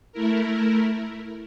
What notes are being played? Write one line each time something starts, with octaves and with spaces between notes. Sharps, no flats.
A3 E4 A#4